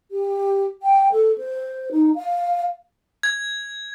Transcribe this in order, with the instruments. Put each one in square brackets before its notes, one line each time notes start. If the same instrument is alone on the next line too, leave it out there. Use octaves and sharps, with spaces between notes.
[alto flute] G4
G5
A4
C5
D#4
F5
[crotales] G#6